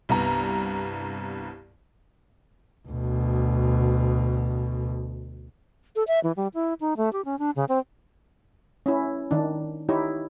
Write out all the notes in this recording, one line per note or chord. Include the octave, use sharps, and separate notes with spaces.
C2 G2 B3 A#5
D2 B2
A4
E5
E3
G3
E4
D#4
A3
G4
C#4
D4
C#3
C4
C#4 E4
D#3 D4
D#4 E4 G4 C#5